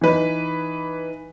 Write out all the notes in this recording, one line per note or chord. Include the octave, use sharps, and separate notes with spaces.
E3 D#4 B4